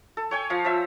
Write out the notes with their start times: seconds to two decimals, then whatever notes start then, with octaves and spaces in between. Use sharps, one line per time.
0.17 A4
0.31 C#5 G5 G#5
0.50 F3 F5
0.64 F3 E5 E6